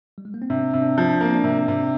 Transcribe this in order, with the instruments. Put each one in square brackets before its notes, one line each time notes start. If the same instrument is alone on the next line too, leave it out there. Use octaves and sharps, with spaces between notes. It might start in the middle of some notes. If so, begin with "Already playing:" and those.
[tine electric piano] G3
G#3
A#3
C4
[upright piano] C3 [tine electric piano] D4
[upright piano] C3
[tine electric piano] D4
[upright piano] F3
[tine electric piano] D4
[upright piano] A#3 [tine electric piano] C4
[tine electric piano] D4
[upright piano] C3
C3